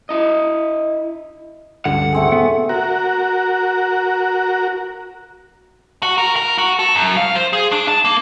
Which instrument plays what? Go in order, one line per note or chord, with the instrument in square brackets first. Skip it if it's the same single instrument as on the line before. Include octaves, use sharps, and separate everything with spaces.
[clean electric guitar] E4 D#5
[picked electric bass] C#2 G2 D3 [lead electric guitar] F#5
[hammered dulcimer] A3 C4 G#4
[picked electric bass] D#1 B3
[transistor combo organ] F#4 A#4
[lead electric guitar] F#4
A#4
A#4
F#4
A4
F#2
F5
C5
G#4
D4
A5
A#3